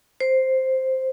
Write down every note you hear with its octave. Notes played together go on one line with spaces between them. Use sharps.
C5